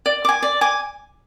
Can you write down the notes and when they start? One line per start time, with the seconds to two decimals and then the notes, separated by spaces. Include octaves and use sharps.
0.06 D5
0.25 G#5 D6
0.42 D5
0.61 G#5 D6